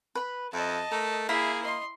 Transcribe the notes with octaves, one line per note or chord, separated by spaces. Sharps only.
B4 B5
F2 D#5 E5 A5
A3 A#4
A#3 E4 G#4 E5 B5
D#5 C6